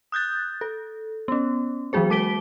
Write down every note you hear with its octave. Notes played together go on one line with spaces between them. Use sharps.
D#6 F#6 G6 A6
A4
B3 C#4
E3 F#3 A#3 F#4 G#4 C5
G#3 D6 B6 D7 G7